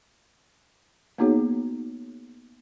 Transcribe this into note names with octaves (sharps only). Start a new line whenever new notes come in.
A#3 B3 D#4 F#4 G#4 C#5